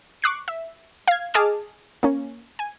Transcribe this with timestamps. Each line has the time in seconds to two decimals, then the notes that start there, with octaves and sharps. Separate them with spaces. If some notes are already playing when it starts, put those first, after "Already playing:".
0.22 C#6 D6 F#6 C7
0.48 E5
1.08 F5 G#6
1.34 G#4 D#5 A5 D6 F6
2.03 A#3 C#4
2.59 G#5